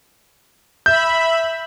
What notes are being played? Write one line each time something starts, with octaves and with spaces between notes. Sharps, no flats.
E5 B5 G6